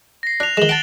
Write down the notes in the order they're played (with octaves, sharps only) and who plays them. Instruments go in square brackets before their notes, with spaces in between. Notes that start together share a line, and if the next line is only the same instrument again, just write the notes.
[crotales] A#6 C7
[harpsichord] D4 [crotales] F#6 F7
[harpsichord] D#3 G#3 [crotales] E7 F#7 G7
[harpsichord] F#5 A5 [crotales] A6 D7